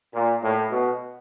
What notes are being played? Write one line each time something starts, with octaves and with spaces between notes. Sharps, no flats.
A#2
A2
B2